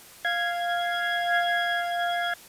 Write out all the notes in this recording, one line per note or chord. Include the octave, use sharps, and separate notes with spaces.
F5 G#6